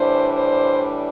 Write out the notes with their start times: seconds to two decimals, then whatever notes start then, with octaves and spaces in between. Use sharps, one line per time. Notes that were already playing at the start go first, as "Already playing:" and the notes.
Already playing: A2 E3 G3 D4 C5
0.35 C5